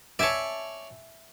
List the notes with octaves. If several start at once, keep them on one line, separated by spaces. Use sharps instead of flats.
C#5 D5 E5 G#5 A5